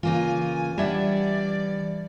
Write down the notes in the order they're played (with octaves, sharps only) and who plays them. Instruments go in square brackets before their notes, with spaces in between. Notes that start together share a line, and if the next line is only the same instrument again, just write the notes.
[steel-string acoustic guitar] C#3 A#3 F4 [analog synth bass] E3 [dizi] G#5
[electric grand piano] G3 G#6 [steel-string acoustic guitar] D4 E5 F#5 [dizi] D5